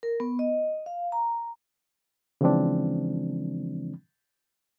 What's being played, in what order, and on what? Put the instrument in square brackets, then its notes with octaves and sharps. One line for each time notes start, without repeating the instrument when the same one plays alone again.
[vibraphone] A#4
B3
D#5
F5
A#5
[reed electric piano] C#3 E3 F3 G#3 C4 D4